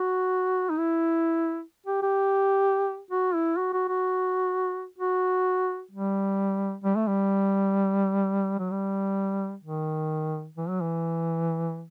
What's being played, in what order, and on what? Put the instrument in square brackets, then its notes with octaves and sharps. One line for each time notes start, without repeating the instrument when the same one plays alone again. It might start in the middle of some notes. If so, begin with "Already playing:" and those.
Already playing: [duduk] F#4
D#4
E4
G4
G4
F#4
E4
F#4
F#4
F#4
F#4
G3
G3
A3
G3
F#3
G3
D#3
E3
F#3
E3